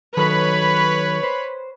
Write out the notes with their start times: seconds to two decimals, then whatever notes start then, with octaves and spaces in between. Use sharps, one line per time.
0.17 D#3 F#3 A4 B4 C#5 B5
1.23 C5